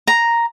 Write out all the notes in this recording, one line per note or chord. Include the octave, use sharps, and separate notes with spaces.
A#5